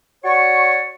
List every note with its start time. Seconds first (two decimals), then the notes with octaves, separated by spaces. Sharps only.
0.24 F#4 C#5 D5 C#6